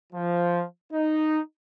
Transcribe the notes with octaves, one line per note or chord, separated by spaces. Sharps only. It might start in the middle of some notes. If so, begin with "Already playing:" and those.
F3
D#4